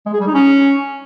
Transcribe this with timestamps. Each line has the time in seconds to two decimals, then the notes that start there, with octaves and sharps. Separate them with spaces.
0.06 G#3
0.13 G#4
0.20 G3
0.27 D#4
0.34 C#4